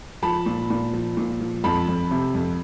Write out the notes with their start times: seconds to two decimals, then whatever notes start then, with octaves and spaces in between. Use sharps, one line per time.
0.23 F3 A5 B5
0.46 A#2
0.70 A#2
0.93 F3
1.17 A#2
1.41 F3
1.64 F2 A5 B5
1.88 F2
2.11 C3
2.34 F2